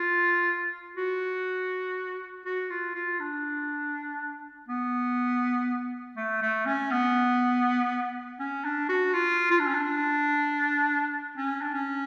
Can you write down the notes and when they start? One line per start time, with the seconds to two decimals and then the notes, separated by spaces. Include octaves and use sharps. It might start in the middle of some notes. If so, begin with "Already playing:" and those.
Already playing: F4
0.97 F#4
2.46 F#4
2.70 F4
2.95 F4
3.20 D4
4.69 B3
6.17 A3
6.42 A3
6.66 C#4
6.91 B3
8.40 C#4
8.64 D4
8.89 F#4
9.13 F4
9.51 F4
9.59 D4
9.67 C#4
9.74 D4
11.37 C#4
11.62 D4
11.74 C#4